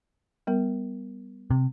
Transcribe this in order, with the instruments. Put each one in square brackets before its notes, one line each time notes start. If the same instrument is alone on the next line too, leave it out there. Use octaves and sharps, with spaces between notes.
[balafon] G3 B3 A#4
[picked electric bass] C3